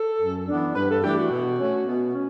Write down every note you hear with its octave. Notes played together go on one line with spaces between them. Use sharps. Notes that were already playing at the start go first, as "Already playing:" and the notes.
Already playing: A4
F#2
E3 B3 D4
G2 B4
A4
E3 A3 D4 G4
F#4
B2
A3 C#4
B2
C#4